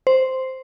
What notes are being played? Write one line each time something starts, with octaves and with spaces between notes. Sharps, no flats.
C5